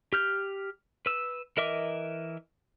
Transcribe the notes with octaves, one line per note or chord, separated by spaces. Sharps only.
G4 F6 G6
B4 E6
E3 A#4 D#5 E5 D6